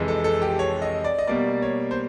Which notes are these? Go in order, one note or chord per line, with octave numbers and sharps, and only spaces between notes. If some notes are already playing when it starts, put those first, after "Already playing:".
Already playing: F2 C3 E3 G#3
A4
A4
G4
C#5
D#5
D5
D#5
B2 G3 A#3 D5
C#5
C5